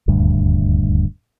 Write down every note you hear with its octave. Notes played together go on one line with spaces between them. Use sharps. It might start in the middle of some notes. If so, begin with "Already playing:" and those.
D#1 D2 G2